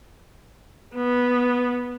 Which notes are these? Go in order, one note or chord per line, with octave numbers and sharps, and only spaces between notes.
B3